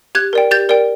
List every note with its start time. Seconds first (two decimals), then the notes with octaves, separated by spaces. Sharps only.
0.15 G4 F#6 G#6
0.33 A#4 D5 G5
0.51 G4 G6 A6
0.69 A#4 D5 G5